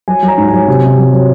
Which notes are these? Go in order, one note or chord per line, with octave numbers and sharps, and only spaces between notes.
F#3 G#5
F#3
A#5
G#2
G#5
F#3
C3
C3
F#3
F#3